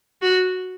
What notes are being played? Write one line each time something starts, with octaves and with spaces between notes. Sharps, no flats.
F#4